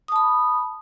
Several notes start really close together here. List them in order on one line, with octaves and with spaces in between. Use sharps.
D#6 A5 B5